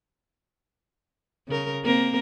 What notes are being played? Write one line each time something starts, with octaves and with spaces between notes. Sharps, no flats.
C#3 A#4
A#3 C4 A#4